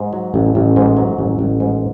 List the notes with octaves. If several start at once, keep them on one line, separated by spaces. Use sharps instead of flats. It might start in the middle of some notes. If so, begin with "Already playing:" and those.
Already playing: G#2
F#3
A1
A1
G#2
F#3
A1
A1
G#2